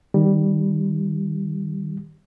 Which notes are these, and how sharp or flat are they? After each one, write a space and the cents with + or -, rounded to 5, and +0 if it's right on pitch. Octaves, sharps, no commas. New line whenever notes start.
D#3 +0 G3 +0